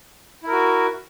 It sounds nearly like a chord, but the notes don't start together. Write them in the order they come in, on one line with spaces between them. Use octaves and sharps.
E4 A#4 F#4